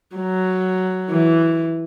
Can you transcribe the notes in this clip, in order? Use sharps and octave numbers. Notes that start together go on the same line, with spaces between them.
F#3
E3